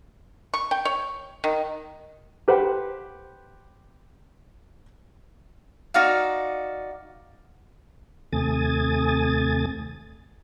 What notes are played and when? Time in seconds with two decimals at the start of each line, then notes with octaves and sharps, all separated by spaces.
0.54 C#6
0.71 G5
0.85 C#5
1.44 D#3
2.48 G4 B4 C5 F#5
5.94 D#4 F#4 D5 F5
8.33 D#2 C3 A3 G#5 D#6 A6